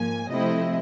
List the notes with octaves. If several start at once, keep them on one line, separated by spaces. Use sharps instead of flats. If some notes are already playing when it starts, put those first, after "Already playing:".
Already playing: G#2 F3 A#3 G#5
C3 F3 A3 C4 E4 D#5